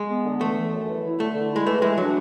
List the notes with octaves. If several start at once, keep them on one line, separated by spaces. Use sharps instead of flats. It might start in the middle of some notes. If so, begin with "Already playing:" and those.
Already playing: G#3
B3
D3
E3 A3
E3
F#2
E3
E4
D3 A3
D3
E4
G#3
E3 A3
E3 G#3
F#3 D4